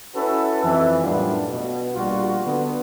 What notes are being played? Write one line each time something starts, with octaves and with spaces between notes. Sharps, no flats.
C#4 E4 F#4 A4 B4
F2 E3
F#2 A2 G3 B3 D4 F4
B2
A#1 G3 F4 F#4
D3 B3